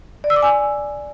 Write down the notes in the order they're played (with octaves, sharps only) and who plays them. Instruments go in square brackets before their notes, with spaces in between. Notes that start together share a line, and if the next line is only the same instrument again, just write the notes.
[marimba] D5
E6
D6
G#5